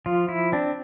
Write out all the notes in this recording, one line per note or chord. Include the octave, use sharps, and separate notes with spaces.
F3 F4
E4
C4 D4